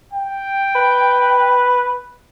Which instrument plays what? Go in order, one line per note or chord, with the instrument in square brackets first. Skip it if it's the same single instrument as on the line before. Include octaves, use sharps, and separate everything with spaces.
[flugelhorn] G5
[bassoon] B4